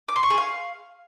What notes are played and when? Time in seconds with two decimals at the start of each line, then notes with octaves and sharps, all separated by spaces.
0.08 D6
0.16 C6
0.23 C#6
0.30 G#4
0.38 F5